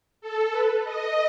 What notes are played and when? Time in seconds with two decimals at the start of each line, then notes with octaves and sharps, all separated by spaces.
0.21 A4
0.52 B4
0.83 D#5